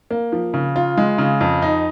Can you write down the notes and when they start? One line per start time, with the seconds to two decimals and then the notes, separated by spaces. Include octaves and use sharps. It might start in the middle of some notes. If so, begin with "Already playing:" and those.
0.11 A#3
0.32 F3
0.54 C#3
0.76 F4
0.97 G#3
1.18 C#3
1.41 F2
1.62 D#4